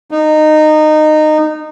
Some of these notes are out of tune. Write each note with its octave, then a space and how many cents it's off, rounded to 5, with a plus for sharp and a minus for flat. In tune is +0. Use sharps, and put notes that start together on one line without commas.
D#4 -20